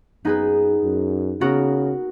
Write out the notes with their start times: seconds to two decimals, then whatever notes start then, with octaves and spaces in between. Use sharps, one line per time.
0.25 F#2 B3 D#4 G#4 B4
0.83 F#2
1.41 C#3 B3 F#4 A#4